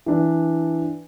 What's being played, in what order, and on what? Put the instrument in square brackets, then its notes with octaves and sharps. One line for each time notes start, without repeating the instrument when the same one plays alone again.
[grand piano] E3 D4